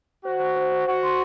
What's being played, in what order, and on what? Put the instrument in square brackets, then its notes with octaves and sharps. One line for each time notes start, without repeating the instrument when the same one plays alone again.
[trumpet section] F#4 [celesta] C5
[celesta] C5
C5
C5
[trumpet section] F#4 [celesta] F#5
[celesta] C6